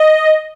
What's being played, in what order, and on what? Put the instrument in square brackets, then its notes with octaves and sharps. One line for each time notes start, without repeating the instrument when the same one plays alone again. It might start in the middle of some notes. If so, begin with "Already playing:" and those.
Already playing: [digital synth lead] D#5